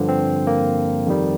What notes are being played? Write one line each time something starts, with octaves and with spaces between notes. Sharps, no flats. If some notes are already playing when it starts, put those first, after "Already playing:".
Already playing: G2 D3 F3
C4
A#3
F2 D#3 G3